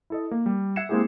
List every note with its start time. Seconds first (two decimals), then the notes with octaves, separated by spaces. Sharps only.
0.10 E4 A4 D#5
0.31 A#3
0.46 G3
0.76 E5 F#5 G#6 C7 C#7 E7
0.89 G#3 A#3 C4 E4 G4 G#4